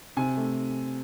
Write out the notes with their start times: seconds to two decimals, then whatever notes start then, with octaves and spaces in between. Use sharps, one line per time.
0.17 C3 G#5
0.37 A3